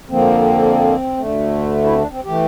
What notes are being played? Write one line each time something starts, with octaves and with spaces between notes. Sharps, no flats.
F2 D3 F3 A#3 C4
D2 D3 A3
E4
C4
D4
C4
E3 A3 G4